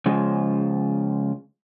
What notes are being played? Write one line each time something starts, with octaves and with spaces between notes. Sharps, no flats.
C#3 F3 G#3